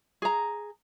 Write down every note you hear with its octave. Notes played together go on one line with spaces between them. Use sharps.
G#4 A#5